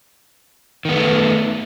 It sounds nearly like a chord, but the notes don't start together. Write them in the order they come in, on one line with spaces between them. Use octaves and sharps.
D#3 B3 A3